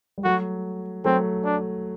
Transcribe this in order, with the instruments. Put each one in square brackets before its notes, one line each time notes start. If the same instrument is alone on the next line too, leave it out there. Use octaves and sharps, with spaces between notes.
[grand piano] G3
[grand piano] F#3 A3 [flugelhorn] F#4
[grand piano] F#3 A3 [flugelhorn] C4
[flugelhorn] D4